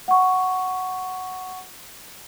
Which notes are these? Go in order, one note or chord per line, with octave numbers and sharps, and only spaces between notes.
F#5 C#6